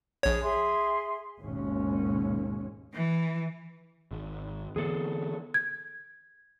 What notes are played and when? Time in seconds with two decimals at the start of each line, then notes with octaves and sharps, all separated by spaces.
0.23 A#1 G#4 C#5
0.42 G#4 E5 C6
1.41 G#1 D#2 B2 G#3 C#4
2.93 E3
4.11 G#1
4.76 D3 E3 B3 G#4 A4
5.54 G#6